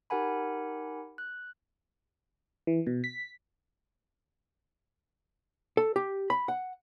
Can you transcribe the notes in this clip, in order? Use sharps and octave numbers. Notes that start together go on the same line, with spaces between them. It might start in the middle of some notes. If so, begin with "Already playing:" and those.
D#4 G4 A#4 F#5 G#5 B5
F#6
E3
B2
B6
A4
G4
B5
F#5